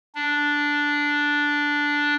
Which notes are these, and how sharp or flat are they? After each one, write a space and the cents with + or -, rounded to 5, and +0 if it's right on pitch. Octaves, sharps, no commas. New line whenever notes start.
D4 -5